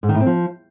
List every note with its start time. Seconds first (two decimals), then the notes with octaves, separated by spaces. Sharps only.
0.03 G#2
0.09 D#3
0.15 A2
0.20 C4
0.26 F3